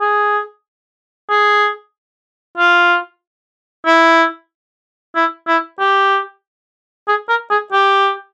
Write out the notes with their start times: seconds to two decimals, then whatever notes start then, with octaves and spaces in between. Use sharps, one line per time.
0.01 G#4
1.30 G#4
2.58 F4
3.86 E4
5.15 E4
5.48 E4
5.80 G4
7.08 G#4
7.29 A#4
7.51 G#4
7.73 G4